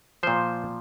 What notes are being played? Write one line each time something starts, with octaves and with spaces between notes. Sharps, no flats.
A#2 F3 C5